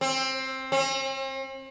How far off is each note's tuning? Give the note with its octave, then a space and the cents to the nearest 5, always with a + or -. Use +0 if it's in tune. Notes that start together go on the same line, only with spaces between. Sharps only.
C4 +15
C4 +45